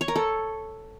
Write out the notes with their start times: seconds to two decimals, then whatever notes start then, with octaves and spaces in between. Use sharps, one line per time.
0.01 C#5
0.08 A#4
0.16 A4